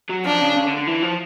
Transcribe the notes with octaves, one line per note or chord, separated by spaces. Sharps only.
F#3
F3 D4
C#3
C#3
D3
D3
E3
F3